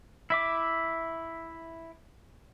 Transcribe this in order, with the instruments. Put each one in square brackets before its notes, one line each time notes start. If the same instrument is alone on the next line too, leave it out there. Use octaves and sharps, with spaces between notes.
[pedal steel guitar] E4 E5 D6